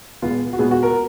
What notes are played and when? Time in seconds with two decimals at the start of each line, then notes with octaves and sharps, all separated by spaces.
0.22 A#2 G#3 B3 F4
0.53 F#4
0.59 A#2 G#3 B3 G#4
0.71 F#4
0.83 A#4